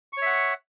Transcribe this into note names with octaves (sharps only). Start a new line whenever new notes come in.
C#5 E5 F#5 C#6